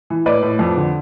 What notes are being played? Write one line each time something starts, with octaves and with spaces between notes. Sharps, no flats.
E3
A2 B4 D5
A2
F2
D3